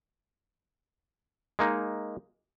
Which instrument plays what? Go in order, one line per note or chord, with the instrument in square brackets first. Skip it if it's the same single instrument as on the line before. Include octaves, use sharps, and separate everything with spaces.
[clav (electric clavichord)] G#3 A#3 D#4